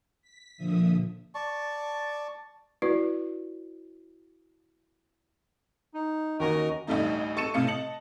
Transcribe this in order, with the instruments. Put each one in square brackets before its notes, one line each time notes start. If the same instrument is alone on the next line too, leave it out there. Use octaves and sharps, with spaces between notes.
[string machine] B6
A#2 D3 F3 E5 D#6
[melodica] D5 A5 C#6
[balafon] E4 F#4 B4 D5
[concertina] D#4
[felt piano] D#2 C#4 C#6 [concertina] F#4 [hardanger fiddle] A#4 D#5
[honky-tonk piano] A1 D2 G3 A3 D#4
A4 C#6 A6 C#7 D#7 E7
A2 C3 F5 C#7
D#5 A5 C#7 F#7